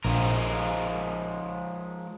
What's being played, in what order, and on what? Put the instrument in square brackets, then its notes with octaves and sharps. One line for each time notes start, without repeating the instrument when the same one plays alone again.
[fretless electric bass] A#1 [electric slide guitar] F3 G#3 A#4